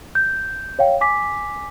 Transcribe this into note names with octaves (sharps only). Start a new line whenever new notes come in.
G6
C#5 F5 G5
G#5 D6 B6